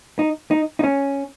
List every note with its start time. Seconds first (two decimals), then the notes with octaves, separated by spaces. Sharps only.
0.19 D#4
0.51 D#4
0.79 D#4
0.84 C#4